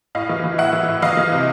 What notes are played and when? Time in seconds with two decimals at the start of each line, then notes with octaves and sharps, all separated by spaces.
0.15 A2 D#5 F5
0.29 E3
0.44 E3
0.58 A2 E5 F#5
0.73 E3
0.88 A2
1.02 E3 D#5 F5
1.17 E3
1.32 C3